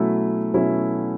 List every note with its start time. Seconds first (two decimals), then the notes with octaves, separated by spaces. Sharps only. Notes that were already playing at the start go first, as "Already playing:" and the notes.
Already playing: B2 F#3 A3 C#4 E4
0.54 B2 F#3 A3 C#4 E4